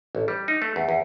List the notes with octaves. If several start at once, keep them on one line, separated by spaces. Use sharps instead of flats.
A1
G3
D#4
A3
E2
E2